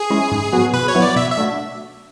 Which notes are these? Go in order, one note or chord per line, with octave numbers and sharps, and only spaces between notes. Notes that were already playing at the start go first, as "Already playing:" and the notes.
Already playing: G#4
G#3 C#4 E4
G#2
F#3 B3 F#4
B2 B4
C#5
F#3 B3 E4
D5
B2 E5
E5
A3 D4 F#4